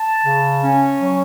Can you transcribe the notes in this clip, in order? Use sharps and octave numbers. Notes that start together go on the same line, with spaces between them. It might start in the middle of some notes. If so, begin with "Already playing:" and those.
Already playing: A5
C#3
C#4
F#3